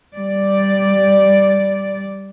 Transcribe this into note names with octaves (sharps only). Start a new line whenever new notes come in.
G3 D5